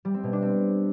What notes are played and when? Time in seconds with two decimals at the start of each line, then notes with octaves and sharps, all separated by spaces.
0.05 G3
0.14 C4
0.23 B2
0.33 D4
0.42 C4